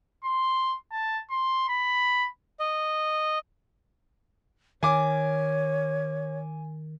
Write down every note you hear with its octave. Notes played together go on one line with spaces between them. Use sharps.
C6
A5
C6
B5
D#5
D#3 C#5 G#5 D6